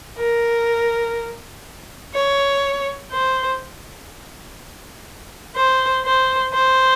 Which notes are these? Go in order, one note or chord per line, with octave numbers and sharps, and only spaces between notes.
A#4
C#5
C5
C5
C5
C5